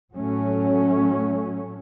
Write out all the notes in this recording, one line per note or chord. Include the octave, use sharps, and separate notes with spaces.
A2 F#3 A3 C#4